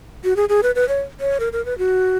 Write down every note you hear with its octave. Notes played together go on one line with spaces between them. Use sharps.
F#4
G#4
G#4
B4
B4
C#5
C#5
A#4
A#4
B4
F#4